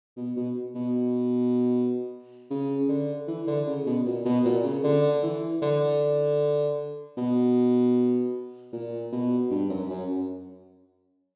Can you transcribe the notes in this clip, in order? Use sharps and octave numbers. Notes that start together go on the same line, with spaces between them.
B2
B2
B2
C#3
D3
E3
D3
C#3
B2
A#2
B2
A#2
C#3
D3
E3
D3
B2
A#2
B2
G2
F#2
F#2